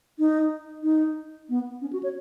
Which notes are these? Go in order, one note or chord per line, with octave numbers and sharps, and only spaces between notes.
D#4
D#4
B3
C#4
F#4
C#5